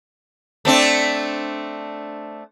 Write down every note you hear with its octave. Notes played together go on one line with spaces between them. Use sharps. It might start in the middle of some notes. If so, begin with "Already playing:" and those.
A3 C4 D4